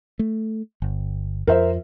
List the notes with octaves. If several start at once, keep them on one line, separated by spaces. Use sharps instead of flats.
A3
G1
F2 F3 A#4 C5 E5